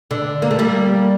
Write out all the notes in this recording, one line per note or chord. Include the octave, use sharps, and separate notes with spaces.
D3
A#3
A3
G3 A#3